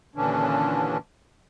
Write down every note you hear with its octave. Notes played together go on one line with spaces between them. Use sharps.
D#2 A#2 D3 E3 C#4 D4